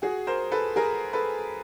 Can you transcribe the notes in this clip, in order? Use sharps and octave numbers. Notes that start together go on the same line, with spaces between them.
F#4 G#4
A#4 C5
A4 B4
G#4 A#4
A4 B4